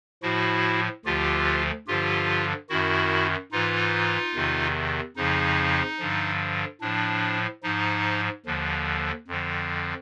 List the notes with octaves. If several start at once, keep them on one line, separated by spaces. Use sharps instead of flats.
A2 F3 E4 F#4
D2 D3 F3 F4 G4
G2 D3 F3 F4 G4
F#2 D#3 E4 F#4
G#2 E3 D#4 F4
E2 C3 D#3
F2 C#3 F3 D#4
G2 D3 F3
A2 F3 D4
G#2 F3 D#4
D#2 D3 F3
F2 D3 F3